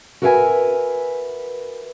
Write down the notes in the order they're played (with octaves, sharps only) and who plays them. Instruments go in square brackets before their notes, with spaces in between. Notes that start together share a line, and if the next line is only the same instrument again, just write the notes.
[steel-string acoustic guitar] F#4 A#4 B4 E5 F5 G#5